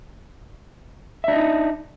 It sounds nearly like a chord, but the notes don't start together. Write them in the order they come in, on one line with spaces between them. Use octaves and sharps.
E5 D4 D#5 D#4